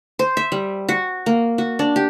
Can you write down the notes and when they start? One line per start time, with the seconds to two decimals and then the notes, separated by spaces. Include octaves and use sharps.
0.19 C5
0.37 E5
0.52 G3
0.89 F#4
1.26 A#3
1.58 F#4
1.79 D4
1.96 G4